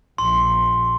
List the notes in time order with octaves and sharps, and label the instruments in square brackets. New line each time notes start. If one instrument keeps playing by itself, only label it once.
[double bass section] A#1 [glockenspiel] C6